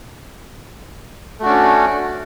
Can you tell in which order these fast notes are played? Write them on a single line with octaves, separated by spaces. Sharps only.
A3 F#4 D4 C#4